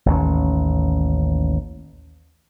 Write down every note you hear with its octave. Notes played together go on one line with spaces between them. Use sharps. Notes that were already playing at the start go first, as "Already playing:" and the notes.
A1 D#2 C#4